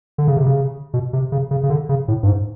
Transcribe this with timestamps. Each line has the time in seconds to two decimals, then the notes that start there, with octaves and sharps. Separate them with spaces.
0.18 D3
0.28 C#3
0.37 C3
0.46 C#3
0.94 B2
1.13 C3
1.32 C#3
1.51 C#3
1.63 C#3
1.70 D3
1.89 C#3
2.08 A2
2.23 G2
2.27 G#2